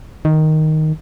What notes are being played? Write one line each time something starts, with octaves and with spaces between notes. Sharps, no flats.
D#3